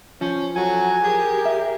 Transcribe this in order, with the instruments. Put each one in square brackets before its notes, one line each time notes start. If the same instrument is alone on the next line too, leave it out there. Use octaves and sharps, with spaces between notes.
[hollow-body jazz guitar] F3 [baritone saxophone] C#4
[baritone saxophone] F#3 [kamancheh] F#4 A4 [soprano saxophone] G#5
[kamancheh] G4 A#4 [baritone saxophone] G#4
[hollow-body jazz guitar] E5